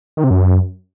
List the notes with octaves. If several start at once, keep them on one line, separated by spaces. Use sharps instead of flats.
D#3
C3
F#2